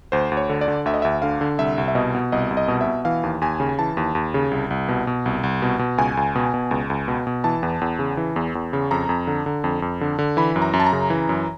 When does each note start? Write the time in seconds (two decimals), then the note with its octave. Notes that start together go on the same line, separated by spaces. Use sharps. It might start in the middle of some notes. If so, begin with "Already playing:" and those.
0.12 D2 C5
0.32 D2
0.37 C#5
0.49 D3
0.61 D5
0.68 D3
0.86 D2 E5
0.94 D#5
1.02 D2 E5
1.22 D3 F5
1.41 D3
1.58 C2 E5
1.78 C2
1.88 E5
1.95 B2 D#5
2.15 B2
2.32 C2 D#5
2.51 C2
2.57 D#5
2.68 B2
2.81 E5
2.87 B2
3.05 E3 F5
3.23 D#2
3.41 D#2 G#5
3.60 C#3
3.69 G#5
3.79 E3 A5
3.97 D#2
4.15 D#2
4.34 C#3
4.51 C2
4.71 C2
4.88 B2
5.07 B2
5.26 C2
5.44 C2
5.62 B2
5.79 B2
5.98 C#2 G#5
6.17 C#2
6.35 B2
6.54 B2
6.71 C#2
6.90 C#2
7.08 B2
7.27 B2
7.44 E3 A5
7.63 E2
7.81 E2
7.99 C#3
8.17 E3
8.36 E2
8.55 E2
8.73 C#3
8.91 F2 A#5
9.09 F2
9.27 D3
9.46 D3
9.64 F2
9.82 F2
10.01 D3
10.19 D3
10.37 E3 B5
10.56 F#2
10.62 A#5
10.73 F#2
10.80 A5
10.86 A#5
10.93 C#3
11.10 E3
11.29 F#2